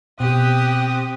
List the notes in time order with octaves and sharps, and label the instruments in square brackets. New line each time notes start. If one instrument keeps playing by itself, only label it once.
[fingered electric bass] B2 [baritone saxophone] C4 [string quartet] G4 [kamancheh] D#6 F#6